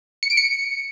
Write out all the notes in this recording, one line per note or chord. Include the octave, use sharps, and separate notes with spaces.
C#7
D7
C#7